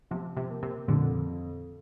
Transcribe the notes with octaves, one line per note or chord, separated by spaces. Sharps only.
C3 F3
C3
A#3
C3
F2 A#2 D3